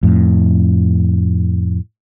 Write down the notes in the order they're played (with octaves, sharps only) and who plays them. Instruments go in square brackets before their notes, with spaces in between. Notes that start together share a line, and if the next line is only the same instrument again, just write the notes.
[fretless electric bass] F2 A2